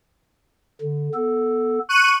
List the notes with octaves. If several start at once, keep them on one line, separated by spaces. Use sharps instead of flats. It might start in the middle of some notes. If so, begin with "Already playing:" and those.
D3
B3 A4
C#6 F#6 D#7